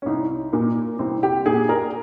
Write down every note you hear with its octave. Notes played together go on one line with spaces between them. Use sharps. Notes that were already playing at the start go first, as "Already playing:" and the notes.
C#4
C2 D#4
A#2 A#3
C2 C4
G4
A#2 G#4
A#4